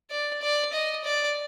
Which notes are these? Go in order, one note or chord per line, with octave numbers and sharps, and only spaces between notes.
D5
D5
D#5
D5